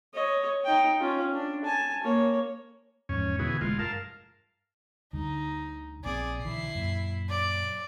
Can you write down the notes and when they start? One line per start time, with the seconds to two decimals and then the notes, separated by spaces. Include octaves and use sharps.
0.14 C#5 D#5
0.65 D#4 G5
1.00 C#4 F4
1.34 D4
1.64 G#5 A5
2.04 A#3 C#5
3.09 E2 G#2 F3 C#4
3.39 B2 D3 E3 G#4
3.61 E1 G#3 A3 F4
3.79 G2 A#4 F5 A5
5.13 D2 D3 G3 D#4
6.04 A#1 B3 C4 G#4 D5
6.44 B1 D3 E3 E4 C7
6.75 F#2 A#2
7.29 D5